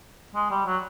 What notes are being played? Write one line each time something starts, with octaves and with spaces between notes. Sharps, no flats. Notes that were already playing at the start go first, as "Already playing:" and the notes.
G#3
G3
F#3